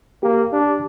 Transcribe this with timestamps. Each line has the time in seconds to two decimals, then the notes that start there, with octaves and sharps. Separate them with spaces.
0.23 A#3 G4
0.53 D4